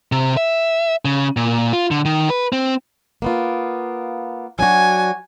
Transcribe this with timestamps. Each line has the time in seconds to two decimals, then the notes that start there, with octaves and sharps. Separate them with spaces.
0.12 C3
0.37 E5
1.05 C#3
1.37 A#2
1.73 F4
1.91 D3
2.05 D#3
2.30 B4
2.52 C4
3.22 A#3 B3 F4
4.59 F#3 D4 F#4 G#5